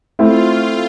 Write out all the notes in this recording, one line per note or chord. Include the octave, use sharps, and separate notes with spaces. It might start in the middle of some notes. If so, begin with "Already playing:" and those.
A3 C4 E4 F4